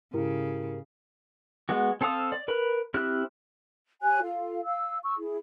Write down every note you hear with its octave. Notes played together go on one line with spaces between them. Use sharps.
G#2 C#3 E4 G4 A#4
G#3 B3 F#4
C4 A4 C5 F5 D#6
D5
A#4 B4 B5
C4 E4 G4 F6 F#6
G4 C#5 G#5 F#6
F4 A4 F5
F5 E6
C#6 E6
E4 G#4